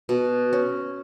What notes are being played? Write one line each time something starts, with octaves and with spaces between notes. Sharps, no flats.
B2
C#4